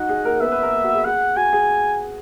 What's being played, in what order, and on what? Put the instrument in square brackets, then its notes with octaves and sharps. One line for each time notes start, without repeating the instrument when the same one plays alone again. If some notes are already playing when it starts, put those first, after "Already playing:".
Already playing: [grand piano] D#4 F#4 D#5 [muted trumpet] F#5
[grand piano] G#4
A#3 A#4
[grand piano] B3 B4 [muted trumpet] E5
[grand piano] B3 B4
A#3 A#4
A#3 A#4
F#4
G#4
[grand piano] G#4 [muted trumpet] F#5
[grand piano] F#4 [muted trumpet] G#5
[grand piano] G#4